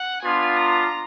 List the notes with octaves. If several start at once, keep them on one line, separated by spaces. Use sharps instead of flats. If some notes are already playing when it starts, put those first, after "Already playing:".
Already playing: F#5
B3 D4 F4 G#5
A#5